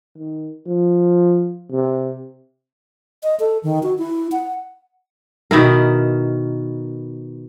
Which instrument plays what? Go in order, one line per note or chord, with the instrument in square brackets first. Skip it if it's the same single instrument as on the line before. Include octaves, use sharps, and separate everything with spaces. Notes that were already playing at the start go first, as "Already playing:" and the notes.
[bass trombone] D#3
F3
C3
[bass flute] D#5
A4
D#3
F#4
E4
F#5
[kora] B2 D#3 E4 A#4